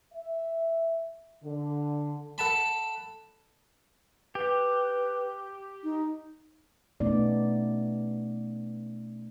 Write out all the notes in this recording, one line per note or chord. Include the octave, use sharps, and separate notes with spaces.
E5
D3
A4 F#5 A5 B5
G4 B4
D#4
B2 A3 B3 C#4 D#4 D5